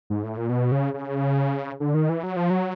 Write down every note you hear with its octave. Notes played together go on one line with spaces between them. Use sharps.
G#2
A2
A#2
B2
C#3
C#3
D3
D#3
E3
F#3
F3
F#3